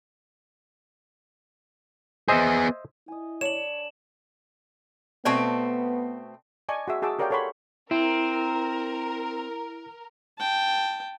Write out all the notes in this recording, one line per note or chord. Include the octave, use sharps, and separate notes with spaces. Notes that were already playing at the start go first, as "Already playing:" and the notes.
B3 G#4 C5 D#5 E5
E4 D#5 G#5
D4 C#5 E7 F#7
B2 A3 B3 C4 D5 A5 C#6
D5 D#5 G#5 A5 C#6
F#4 G#4 E5
F#4 G#4 A5 D6 E6
G4 A#4 C#5 D5 F5 G5
A4 A#4 C#5 F#5 B5 C6
C4 E4 A#4
G5 A5